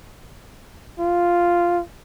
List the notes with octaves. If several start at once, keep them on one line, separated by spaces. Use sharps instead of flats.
F4